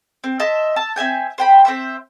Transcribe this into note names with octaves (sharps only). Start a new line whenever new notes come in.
C4
D#5 E5 A5 C6
A5 E6
C4 E5 G#5 G6
C5 G5 B5
C4 C5 E5